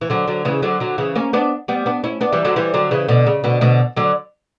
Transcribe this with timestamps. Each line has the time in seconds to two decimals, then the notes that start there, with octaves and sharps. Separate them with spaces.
0.01 E3
0.10 D3 F#3
0.28 D3 F#3
0.45 C#3 E3
0.62 D3 F#3
0.80 D3 F#3
0.98 C#3 E3
1.15 A#3 C#4
1.33 B3 D4
1.68 G3 B3
1.86 B3 D4
2.04 C#4 E4
2.21 B3 D4
2.32 E3 G3
2.45 D3 F#3
2.56 E3 G3
2.74 D3 F#3
2.91 C#3 E3
3.08 B2 D3
3.27 C#3
3.44 B2 D3
3.61 B2 D3
3.97 D3 F#3